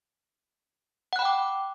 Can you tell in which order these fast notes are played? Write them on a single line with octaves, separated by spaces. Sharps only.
F#5 F#6 B5 G5 D6